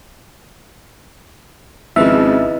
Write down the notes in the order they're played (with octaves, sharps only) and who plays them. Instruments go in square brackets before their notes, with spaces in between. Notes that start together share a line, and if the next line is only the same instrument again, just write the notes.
[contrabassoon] G#1 [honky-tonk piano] C#3 F3 [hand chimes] E4 B4 D#5 [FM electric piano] E5